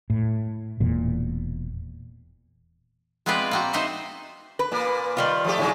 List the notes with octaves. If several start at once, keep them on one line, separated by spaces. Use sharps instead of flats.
A2
E1 E2 A#2
G#3 B3 C4 F4 B4 D5
A#3 C4 F#4
D#4 C5 D#5 E5
B4
A#2 A#3
D#3 G3 F4
F3 A3 G4
G#2 C#3 F#3